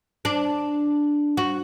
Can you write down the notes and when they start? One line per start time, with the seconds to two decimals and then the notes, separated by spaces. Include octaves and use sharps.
0.25 D4
1.37 F#4